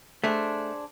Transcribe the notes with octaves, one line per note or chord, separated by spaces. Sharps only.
A3 D4 G#4 C5